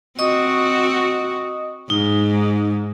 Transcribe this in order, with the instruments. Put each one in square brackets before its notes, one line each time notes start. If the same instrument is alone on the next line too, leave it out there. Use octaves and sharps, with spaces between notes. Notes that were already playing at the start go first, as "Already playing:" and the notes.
[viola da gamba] C4 F#4 [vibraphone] D#5 C#6 D#6
[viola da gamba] G#2 [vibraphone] D#4